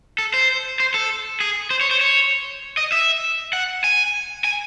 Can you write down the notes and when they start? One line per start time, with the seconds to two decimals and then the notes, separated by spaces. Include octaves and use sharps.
0.18 A4
0.34 C5
0.80 C5
0.94 A4
1.40 G#4
1.71 C5
1.81 C#5
1.91 C5
2.01 C#5
2.77 D#5
2.92 E5
3.53 F#5
3.84 G#5
4.44 G#5